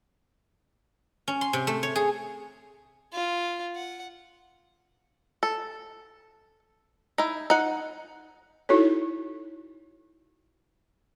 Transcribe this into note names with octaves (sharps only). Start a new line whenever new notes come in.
C#4
C6
C3
A3
C#5
G#4
F4
F#5
A4
D#4 E4
D#4 F#5
D#4 E4 F#4 A4 C#5